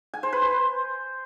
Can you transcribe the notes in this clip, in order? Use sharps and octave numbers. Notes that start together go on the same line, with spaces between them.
G#5
C5
B4
C5